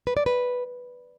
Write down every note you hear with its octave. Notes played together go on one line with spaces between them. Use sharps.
B4
D5
B4